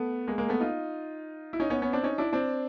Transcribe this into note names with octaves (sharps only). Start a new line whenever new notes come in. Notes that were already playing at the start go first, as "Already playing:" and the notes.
Already playing: A3 B3
G#3 A#3
G#3 A#3
A3 B3
D#4 F4
E4
C#4 D#4
B3 C#4
B3 C#4
C4 D4
C#4 D#4
D4 E4
C4 D4